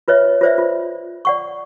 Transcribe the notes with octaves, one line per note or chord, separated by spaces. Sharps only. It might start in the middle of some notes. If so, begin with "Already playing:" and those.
F4 B4 C#5 D#5 E5
F4 B4 C5 D5 E5
F4
D5 F#5 C#6